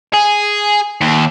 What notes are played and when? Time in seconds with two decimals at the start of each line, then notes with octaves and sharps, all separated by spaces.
0.13 G#4
1.01 D#2